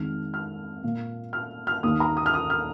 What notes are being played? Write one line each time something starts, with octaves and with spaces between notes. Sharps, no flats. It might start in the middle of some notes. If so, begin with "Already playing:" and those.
Already playing: F2 D#3 G#3 F6
F6
A#2 A#3
F6
F6
D#2 D#3 A#3 D#6
A#5
D#6
F6
D#6
F6